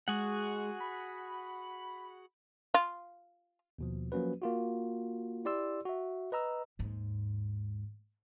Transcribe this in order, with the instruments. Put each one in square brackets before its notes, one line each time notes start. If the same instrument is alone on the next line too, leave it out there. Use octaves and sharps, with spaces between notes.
[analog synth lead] G#3 [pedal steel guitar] F#4 G#4 F#5
[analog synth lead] B5
[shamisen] F4
[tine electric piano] D#2 B2 F3
F3 F#3 A#3 C#4 F#4 B4
A#3 F4 F#4
E4 G4 D5 C6 E6
F#4 E5
B4 D#5 A#5 E6
[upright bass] D#2 G#2